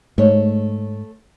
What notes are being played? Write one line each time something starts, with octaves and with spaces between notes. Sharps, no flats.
G#2 A3 C#5